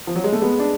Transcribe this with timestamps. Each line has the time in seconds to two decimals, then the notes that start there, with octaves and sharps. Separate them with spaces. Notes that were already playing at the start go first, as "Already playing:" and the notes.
0.07 F3
0.16 F#3
0.24 G#3
0.32 A3
0.42 G#3 B3
0.59 D4